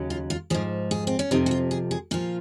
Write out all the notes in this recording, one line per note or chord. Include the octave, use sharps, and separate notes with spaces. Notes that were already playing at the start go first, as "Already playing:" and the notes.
Already playing: D#2 C#3 F#3
F4
F4
G#2 F3 G#4
G#4
C4
C#4
F2 C3 F3 D#4
F#4
F4
G#4
G#4
A#2 F3 F4